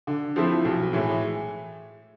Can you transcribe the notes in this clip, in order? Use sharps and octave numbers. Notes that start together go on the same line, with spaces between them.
D3
F3 A3 C4 E4
B1
A2 E3 G#3